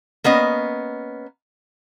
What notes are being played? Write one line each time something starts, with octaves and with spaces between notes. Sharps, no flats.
A#3 B3 C#4 D#5